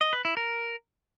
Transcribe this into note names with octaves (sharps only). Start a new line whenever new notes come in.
D#5
B4
E4
A#4